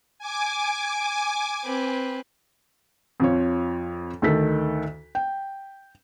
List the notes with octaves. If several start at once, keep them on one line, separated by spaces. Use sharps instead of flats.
G#5 D6
C4 B4
F2 F3 C#5
D2 D#3 A4 B6
G5